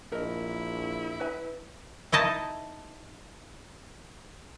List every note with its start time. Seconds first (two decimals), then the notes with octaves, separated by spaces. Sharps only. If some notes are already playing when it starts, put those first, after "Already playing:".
0.12 A#1 E4 A#4 D#5
1.20 B4 E5 G#5
2.12 D#4 E4 D#5 A5